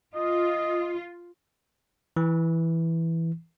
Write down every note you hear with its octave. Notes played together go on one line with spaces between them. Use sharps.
F4 D#5
E3